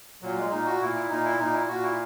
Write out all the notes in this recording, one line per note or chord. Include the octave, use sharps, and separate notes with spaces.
A#2 F#3
G#3
A#2 D#4
F#4
A#2 E4
E4
A#2 D#4
E4
A#2 D#4
E4
A#2 F#4
E4